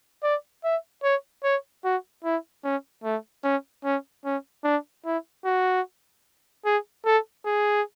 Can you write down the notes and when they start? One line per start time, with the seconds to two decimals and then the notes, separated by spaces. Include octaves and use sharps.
0.23 D5
0.64 E5
1.03 C#5
1.44 C#5
1.84 F#4
2.24 E4
2.64 C#4
3.04 A3
3.44 C#4
3.84 C#4
4.25 C#4
4.64 D4
5.05 E4
5.45 F#4
6.65 G#4
7.05 A4
7.46 G#4